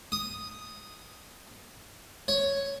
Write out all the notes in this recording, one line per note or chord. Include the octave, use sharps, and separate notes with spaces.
D#6
C#5